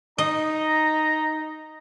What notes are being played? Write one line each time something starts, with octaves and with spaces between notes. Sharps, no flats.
D#4 D#5 A#5